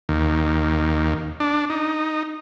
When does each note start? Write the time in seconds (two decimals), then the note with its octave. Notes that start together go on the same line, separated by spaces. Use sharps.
0.09 D#2
1.40 D4
1.70 D#4